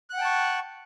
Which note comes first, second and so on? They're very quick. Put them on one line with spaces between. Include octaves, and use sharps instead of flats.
F#6 F#5 G5 A5 C#6